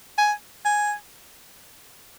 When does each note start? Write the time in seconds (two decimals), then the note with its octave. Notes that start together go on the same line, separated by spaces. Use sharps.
0.18 G#5
0.65 G#5